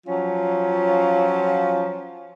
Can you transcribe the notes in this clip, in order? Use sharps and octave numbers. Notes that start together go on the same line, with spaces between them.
F3 F#3 C#4 F4